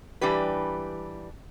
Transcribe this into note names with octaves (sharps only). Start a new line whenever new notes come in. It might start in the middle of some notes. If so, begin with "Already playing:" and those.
E3 G3 D4 G4 B4